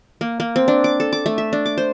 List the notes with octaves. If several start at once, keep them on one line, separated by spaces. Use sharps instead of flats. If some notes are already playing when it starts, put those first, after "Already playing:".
A#3
A#3
C4
D4
D6
A4
D6
A3
E5
D4
D6
C5